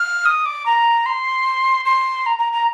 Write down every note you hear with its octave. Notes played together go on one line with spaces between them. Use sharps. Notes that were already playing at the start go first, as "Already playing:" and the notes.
Already playing: F6
D#6
D6
A#5
C6
C6
A#5
A#5
A#5